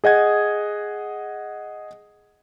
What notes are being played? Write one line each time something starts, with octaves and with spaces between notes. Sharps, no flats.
G#4 D#5 F#5 G#6